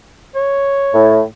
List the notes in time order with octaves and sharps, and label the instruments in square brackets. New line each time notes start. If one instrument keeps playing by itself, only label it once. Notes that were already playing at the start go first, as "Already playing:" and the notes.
[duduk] C#5
[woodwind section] A2